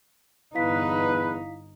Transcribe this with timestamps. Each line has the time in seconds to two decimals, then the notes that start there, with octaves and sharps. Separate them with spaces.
0.55 G1 E2 D#4 E4 B4 F5 B6